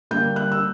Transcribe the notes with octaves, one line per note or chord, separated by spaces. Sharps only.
D3 G3 A#3 G6
F#6
E6